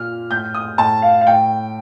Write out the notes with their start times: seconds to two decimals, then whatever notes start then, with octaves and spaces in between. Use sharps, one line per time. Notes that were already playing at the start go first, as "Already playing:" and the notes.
Already playing: A#2 F6
0.31 A2 G6
0.54 D#6
0.78 A2 A5
1.02 F5
1.21 F5
1.27 A2 G5